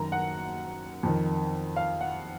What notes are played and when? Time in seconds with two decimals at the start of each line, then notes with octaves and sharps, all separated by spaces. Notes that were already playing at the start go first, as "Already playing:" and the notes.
Already playing: F#2 D#3 A#5
0.12 F#5
1.03 F2 D#3
1.76 F5
2.01 F#5